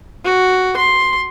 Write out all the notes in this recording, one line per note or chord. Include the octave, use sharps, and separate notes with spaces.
F#4
C6